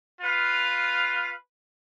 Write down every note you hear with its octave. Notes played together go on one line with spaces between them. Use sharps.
F4 B4 F5